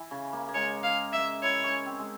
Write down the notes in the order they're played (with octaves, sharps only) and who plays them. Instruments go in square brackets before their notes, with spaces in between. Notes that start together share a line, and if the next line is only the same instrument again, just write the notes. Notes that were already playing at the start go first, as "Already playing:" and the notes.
Already playing: [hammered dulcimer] E3
C#3
A#3
A#3
[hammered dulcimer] G#3 [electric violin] C#5
[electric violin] F5
E5
[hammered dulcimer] E4 [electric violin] C#5
[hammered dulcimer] C#4
C4
G#3